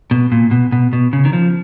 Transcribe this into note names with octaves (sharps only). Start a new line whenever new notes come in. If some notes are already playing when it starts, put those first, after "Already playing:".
B2
A#2
B2
B2
B2
C#3
D#3
F3